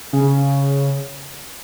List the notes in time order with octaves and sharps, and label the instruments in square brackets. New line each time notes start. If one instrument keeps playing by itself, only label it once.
[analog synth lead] C#3